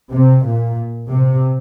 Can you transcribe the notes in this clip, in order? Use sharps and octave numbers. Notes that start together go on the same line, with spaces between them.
C3
A#2
C3